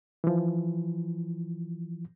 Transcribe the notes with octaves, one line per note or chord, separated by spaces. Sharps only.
E3 F3